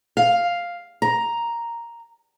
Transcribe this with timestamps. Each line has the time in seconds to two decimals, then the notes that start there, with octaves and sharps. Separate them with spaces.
0.17 F5
1.02 A#5